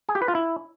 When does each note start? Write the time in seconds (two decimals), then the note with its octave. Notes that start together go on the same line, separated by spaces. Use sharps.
0.09 G#4
0.15 G4
0.22 B4
0.28 F4
0.35 E4